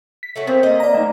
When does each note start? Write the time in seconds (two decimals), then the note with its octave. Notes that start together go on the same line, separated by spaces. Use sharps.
0.23 B6
0.36 A3 C#4 F#4
0.47 A#3 C4 C5
0.63 A#3 D#5
0.80 D5 A#5
0.95 A3 D#4